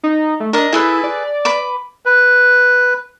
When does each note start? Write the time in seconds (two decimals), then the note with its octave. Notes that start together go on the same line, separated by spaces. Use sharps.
0.03 D#4
0.40 A3
0.53 D4 A#4 D#5
0.73 E4 G#4 A4 B4
1.04 D5
1.45 B4 B5 D6
2.06 B4